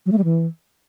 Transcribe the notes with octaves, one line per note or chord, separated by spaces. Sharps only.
F#3
A3
G3
E3